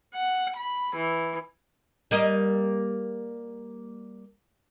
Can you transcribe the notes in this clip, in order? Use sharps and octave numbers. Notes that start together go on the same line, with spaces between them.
F#5
B5
E3
G3 A#3 D#5